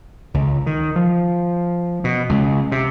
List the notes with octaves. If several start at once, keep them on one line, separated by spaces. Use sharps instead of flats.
C#2
D#3
F3
B2
C#2
C3